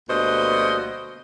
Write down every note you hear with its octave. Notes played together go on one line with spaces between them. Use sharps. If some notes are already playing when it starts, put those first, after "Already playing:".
D2 B2 G3 A#3 C5 D#5